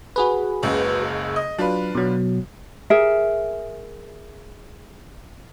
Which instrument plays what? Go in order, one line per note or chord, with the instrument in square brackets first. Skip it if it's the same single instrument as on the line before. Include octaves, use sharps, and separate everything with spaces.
[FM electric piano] F#4 G#4 B4
[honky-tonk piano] F#1 C#2 C#3
D#5
[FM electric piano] F#3 [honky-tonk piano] D4 F4 B4
[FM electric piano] B2 F#3
[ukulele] G#4 A#4 E5